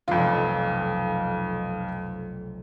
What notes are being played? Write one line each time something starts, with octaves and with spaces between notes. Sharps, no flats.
F1 B1 F2 F4